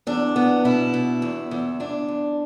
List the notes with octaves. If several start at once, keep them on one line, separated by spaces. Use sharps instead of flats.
E2 D4
B3
B2 E4
B2
E2
E2
E2 D4
E2